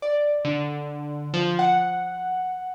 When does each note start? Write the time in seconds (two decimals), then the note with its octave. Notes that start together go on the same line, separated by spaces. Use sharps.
0.02 D5
0.45 D3
1.34 F3
1.59 F#5